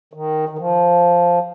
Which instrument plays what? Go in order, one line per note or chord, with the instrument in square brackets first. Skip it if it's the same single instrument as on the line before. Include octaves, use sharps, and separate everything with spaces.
[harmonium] D#3
D#3
F3